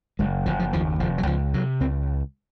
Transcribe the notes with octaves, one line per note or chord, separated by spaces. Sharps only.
F#1 G#3
F#1 F3
F3
D#2 F3
F1 F3
F#3
C#2 F3
C3 F#3
C#2 C4